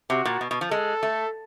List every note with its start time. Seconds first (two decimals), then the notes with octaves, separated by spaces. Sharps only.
0.10 C3 F#4
0.25 A#2
0.41 B2
0.51 B2
0.61 F3
0.71 G#3 A4
1.03 A3